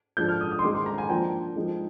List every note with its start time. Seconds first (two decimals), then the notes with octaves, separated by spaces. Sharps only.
0.17 F3 G#3 D4 G6
0.29 F6
0.41 D#6
0.51 D#6
0.59 C6
0.63 D#3 G#3 D#4 D6
0.75 C6
0.86 A#5
0.98 G#5
1.09 F3 A#3 D4 G5
1.56 F3 G#3 D#4